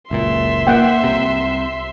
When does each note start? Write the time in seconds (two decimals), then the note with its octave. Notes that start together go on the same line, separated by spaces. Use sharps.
0.11 F#1 C#2 A#2 E5 C6
0.67 A#3 F#5 G5
1.04 C2 C3